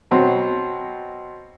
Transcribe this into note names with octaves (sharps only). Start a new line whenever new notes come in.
B2 F#3 C4